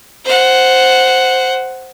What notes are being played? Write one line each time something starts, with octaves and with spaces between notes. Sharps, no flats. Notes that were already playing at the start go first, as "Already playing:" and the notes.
C5 F#5